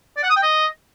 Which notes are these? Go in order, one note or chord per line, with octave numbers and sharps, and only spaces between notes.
D5
F#5
D#6
G5
D#5